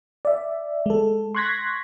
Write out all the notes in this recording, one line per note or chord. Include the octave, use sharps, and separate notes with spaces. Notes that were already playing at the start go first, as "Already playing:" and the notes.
D5 E5
G#3 A4
C6 C#6 F#6 G#6 A#6 B6